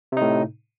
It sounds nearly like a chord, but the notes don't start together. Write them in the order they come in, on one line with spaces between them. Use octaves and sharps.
C3 D#4 A2